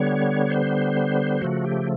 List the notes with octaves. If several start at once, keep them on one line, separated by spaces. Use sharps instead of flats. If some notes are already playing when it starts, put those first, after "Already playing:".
Already playing: D3 G3 B3 C#5
C5
C#3 F3 A3 F#4
G4